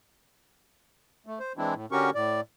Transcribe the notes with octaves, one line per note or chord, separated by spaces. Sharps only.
A3
C5
E3 G#3 C4 D4 E4
A2
D3 C#4 F#4 G4 A#4 C#6
A2 D5